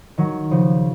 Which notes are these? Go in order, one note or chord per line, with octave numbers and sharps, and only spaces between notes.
D#3 F#3
C#3 F3